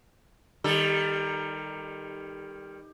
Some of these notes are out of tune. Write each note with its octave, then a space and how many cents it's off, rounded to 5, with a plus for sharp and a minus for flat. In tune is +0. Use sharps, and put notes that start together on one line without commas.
D#3 +0 G3 +20 A4 +0